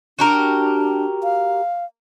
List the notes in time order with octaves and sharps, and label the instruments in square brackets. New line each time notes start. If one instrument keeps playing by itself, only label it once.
[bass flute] D4 [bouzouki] F#4 G4 A#4
[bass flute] F5